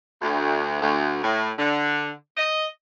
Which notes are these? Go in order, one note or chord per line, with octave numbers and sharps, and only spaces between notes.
D2
D2
A2
D3
D#5